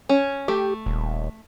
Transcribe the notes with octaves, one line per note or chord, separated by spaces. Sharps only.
C#4
A3 G4
D#1